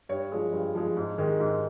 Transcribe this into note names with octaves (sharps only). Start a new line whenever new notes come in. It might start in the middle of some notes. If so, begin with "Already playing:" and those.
G2 C#5
F3 G#3
G2
F3 G#3
G#2
D#3 G#3
G#2